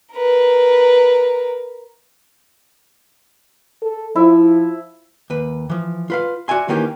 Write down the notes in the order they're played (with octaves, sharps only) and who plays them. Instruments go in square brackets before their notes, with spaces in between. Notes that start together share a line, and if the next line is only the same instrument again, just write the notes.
[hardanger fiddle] A#4 B4
[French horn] A4
[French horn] F3 [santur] E4
[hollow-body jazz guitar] D#2 B4
E3 F3
F4 B4 F5
F#4 D5 E5 G#5 C6
D#3 E3 A#3 C#4 G4